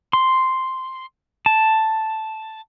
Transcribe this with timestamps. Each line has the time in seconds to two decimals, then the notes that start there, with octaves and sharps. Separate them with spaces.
0.13 C6
1.46 A5